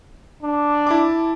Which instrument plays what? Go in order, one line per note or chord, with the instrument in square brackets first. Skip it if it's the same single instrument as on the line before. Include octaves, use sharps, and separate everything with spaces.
[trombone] D4
[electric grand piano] E4 A5 D6